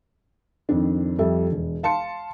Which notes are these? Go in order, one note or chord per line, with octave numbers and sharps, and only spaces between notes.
F2 D#3 C4 D4
F2 G3 A4 E5
E1
F5 A5 C6 C#7